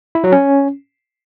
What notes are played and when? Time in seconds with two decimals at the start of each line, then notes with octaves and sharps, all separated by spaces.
0.15 E4
0.24 F#3
0.32 C#4